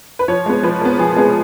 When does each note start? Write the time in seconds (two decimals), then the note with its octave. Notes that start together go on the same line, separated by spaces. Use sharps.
0.19 B4
0.28 F3 C#5
0.46 G#3 B3
0.63 F3 B4
0.81 G#3 B3 A#4
0.99 F3 G#4
1.16 G#3 B3 G#4